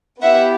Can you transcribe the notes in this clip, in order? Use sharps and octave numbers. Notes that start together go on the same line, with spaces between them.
B3 E4 G4 E5 F#5